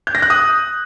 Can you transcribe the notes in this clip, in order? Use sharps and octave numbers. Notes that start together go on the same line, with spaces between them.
G6
A#6
F#6
D#6